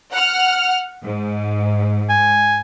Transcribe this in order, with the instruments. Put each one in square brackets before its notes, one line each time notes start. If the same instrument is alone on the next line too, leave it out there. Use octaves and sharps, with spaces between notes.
[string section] F#5 F6
G#2
[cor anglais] G#5